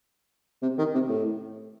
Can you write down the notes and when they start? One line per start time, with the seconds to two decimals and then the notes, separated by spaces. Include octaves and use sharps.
0.63 C3
0.78 D#3
0.95 C3
1.09 A2